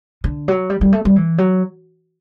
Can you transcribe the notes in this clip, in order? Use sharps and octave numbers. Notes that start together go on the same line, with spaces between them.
D3
F#3
G3
G3
A3
G3
E3
F#3